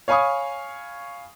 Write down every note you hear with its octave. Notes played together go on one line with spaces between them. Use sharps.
C#5 F5 G#5 B5 C#6 D#6